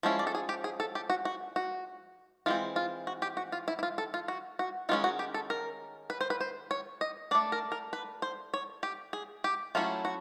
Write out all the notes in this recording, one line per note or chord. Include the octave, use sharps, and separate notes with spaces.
F3 G#3 C#4 E4
D5
A4
G#4
G4
G#4
A4
G4
F#4
F#4
F#4
E3 G#3 C4 F4
F4
F#4
G4
F#4
F4
E4
E4
F4
A4
F4
F#4
F#4
D#3 G#3 C#4 F4
F#4
G4
A4
A#4
B4
C5
B4
C5
C#5
D#5
A3 D4 D5
A#4
A#4
B4
C5
C#5
G4
G#4
G4
F#3 A3 C#4 E4 F4
F#4